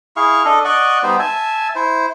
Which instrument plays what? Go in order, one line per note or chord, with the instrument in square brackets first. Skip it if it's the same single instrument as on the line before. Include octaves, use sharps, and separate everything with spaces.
[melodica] E4 G#4 F5 C#6
D4 A4 D#5
D5 D#5 F#5 C#6
G3 B3 D#4 C5
E5 G#5 A5
E4 C5